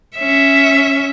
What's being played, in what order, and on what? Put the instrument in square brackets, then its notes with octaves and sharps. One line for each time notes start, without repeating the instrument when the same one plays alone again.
[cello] C#4 E5